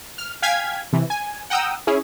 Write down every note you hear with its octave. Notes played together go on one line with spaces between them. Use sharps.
F6
F5 G5 G#5 F6 G#6 B6
C3 E3
G#5
F#5 G5 A#5 D#6 E6
C#4 E4 G#4 C#5